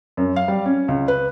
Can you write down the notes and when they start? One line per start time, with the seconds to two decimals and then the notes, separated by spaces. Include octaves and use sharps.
0.17 F#2
0.36 F5
0.48 G3
0.66 C#4
0.88 C#2
1.08 B4